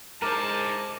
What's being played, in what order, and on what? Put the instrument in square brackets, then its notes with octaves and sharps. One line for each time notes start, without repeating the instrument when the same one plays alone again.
[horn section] G#3 C5 A5 [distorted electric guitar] D#4 E4 [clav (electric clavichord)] A#4 [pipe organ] D6